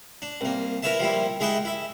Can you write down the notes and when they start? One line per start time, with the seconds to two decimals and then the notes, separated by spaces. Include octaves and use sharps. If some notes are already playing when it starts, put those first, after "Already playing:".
0.22 D4
0.41 C2 A#3
0.83 E4 A#4 B4 C#5 E5 A5
0.99 F3 G3 A#3 E4
1.40 G#3 E4 D#5 E5 F#5 G5
1.65 E4 E5